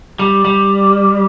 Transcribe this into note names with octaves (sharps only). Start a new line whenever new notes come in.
G3
G3